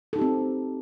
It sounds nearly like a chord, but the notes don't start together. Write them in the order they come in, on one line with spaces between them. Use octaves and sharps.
A4 D#4 G4 C4